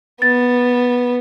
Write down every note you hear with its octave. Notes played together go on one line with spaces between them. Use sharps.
B3 A6